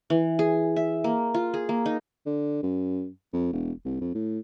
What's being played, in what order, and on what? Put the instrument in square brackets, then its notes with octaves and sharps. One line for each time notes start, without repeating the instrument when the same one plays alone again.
[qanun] E3
G#4
E5
A#3
F4
G#4
A#3
D#4
[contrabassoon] D3
F#2
F2
E1
C2
F2
A2